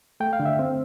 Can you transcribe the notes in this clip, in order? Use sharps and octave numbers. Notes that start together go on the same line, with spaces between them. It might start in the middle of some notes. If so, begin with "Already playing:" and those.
A3 G5
F5
D3
E5
C4